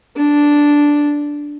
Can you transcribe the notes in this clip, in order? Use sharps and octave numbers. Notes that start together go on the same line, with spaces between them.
D4